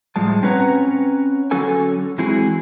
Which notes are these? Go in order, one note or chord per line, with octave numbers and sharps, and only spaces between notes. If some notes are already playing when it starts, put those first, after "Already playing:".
A2 F3 G3 G#3 A5
C4 C#4 B4 C#5 F#5 A#5
D3 F#3 C#4 F#4 A4 G#5
E3 G#3 C4 E4 F#4 G#4